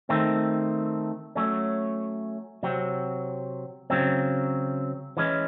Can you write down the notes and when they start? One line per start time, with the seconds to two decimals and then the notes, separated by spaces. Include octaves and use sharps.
0.09 D#3 A3 C4
1.35 F#3 A3 C#4
2.63 C3 F#3 C4
3.90 C#3 F#3 C4
5.17 E3 G#3 C#4